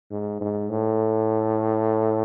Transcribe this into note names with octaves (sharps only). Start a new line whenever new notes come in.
G#2
G#2
A2